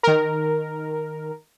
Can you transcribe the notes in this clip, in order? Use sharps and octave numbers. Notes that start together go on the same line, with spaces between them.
D#3 A#4